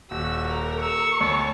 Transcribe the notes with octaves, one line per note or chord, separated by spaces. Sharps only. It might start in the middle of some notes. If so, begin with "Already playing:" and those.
D#1 F#4 E6
A4 A#4
C#6 E6
D2 C#5 A5